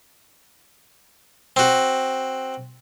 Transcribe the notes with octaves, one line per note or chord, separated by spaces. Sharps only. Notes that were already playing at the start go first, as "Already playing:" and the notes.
C4 F#4